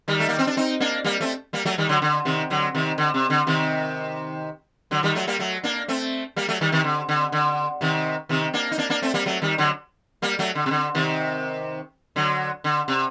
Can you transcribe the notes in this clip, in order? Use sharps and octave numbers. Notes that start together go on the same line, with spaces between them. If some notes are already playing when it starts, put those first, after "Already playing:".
D#3 G3
A3
A#3
C4
D4
C4 D#4
A#3 D4
G3 A#3
A3 C4
G3 A#3
F#3 A3
D#3 G3
D3 F#3
D3
C3 D#3
D3 F#3
C3 D#3
D3
C3
D3
C3 D#3
D3 F#3
D#3 G3
F#3 A3
G3 A#3
F#3 A3
A#3 D4
A3 C4
G3 A#3
F#3 A3
D#3 G3
C3 D#3
D3
D3
D3
C3 D#3
C3 D#3
A#3 D4
D#4
A#3 D4
A#3 D4
A3 C4
G3 A#3
F#3 A3
D#3 G3
D3 F#3
G3 A#3
F#3 A3
D3
C3
D3
C3 D#3
D3 F#3
D3
C3